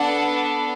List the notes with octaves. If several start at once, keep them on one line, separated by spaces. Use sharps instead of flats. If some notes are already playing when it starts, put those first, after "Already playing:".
Already playing: B3 D4 A4 F#5